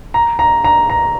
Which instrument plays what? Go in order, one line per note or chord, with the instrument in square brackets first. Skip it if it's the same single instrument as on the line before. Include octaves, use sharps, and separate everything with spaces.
[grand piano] A#5
A#5
A#5
A#5